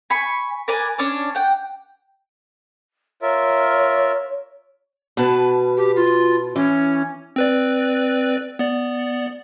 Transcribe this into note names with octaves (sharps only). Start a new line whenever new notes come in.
G#5 B5 C#6
A#4 B4 D5 G#5
C#4 D4 C#5 D5
F#5 G5
F4 A#4 C#5 E5
B2 B4 A5
G4
F4
E3 C#4
C4 B4 D5
B3 D5